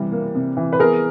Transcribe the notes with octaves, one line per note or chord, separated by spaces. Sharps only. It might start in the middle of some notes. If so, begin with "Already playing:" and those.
Already playing: C3 E3 G3
A#3
C3
E3
B4
B3 G#4 A#4